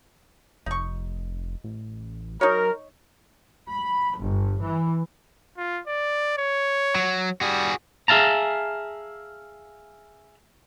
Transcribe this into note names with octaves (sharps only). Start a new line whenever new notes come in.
F1 D#4 C#6
A1
F#3 D#4 A#4 C#5
B5
G1
E3
F4
D5
C#5
F#3
G3 F#4 G#4
G#4 E5 F5 A5 A#5